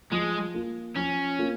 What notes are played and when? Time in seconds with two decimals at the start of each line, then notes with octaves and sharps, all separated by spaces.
0.12 F3 G#3
0.54 A#3 F4
0.96 F3 C#4
1.39 A#3 F4